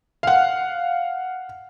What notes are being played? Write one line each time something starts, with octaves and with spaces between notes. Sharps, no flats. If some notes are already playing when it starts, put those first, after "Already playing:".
F5 F#5